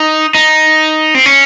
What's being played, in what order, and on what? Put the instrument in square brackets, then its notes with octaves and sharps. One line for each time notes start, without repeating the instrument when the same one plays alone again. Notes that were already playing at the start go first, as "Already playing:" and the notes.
Already playing: [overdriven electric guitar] D#4
D#4
C4
C#4